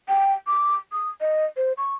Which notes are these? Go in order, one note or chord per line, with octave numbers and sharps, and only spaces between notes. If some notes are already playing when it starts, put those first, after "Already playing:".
G5
D6
D#6
D#5
C5
C#6